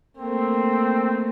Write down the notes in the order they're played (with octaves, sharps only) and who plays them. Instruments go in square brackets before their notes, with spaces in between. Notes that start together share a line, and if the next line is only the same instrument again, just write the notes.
[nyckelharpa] A3 A#3 [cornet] C4